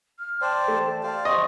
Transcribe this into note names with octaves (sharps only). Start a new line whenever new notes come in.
F6
C5 D5 G5 A5
A3
G4 C5 D5 F5
D#5 C6 C#6